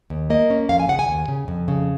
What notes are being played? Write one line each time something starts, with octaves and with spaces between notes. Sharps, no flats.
D#2
A#3 D#5
C#4
F2 F5
G#5
C#3 F#5
G#5
D#2
C#3
F2
C#3